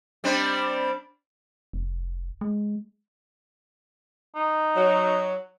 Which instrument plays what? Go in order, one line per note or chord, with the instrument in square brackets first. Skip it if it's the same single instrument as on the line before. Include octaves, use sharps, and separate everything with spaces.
[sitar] G3 C4 D4
[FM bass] F1
G#3
[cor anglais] D#4
[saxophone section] F#3